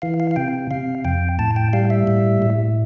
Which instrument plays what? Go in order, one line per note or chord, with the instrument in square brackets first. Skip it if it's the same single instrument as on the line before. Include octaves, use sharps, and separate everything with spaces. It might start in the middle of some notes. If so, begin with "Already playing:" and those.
[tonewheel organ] E3 F5
F5
F5
C3 G5
C3 F5
F2 G5
A2 A5
G5
G3 F5
E5
A2
A2